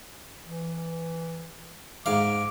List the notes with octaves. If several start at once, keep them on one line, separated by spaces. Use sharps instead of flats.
E3
G#2 F5 D6